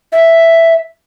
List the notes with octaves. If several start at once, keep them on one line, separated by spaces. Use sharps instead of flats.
E5